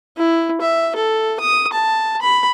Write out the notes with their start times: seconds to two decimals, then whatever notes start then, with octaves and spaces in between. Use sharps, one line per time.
0.17 E4
0.61 E5
0.96 A4
1.40 D#6
1.73 A5
2.22 B5